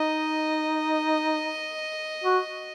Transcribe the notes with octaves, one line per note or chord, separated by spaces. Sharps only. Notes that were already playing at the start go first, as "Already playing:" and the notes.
Already playing: D#4 D#5
F#4